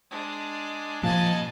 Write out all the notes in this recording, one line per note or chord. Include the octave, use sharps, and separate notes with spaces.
G#3 D4
A#2 F3 D#5 G#5 A5